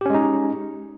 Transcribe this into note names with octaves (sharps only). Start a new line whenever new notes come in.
G#3 C#4 D#4 G4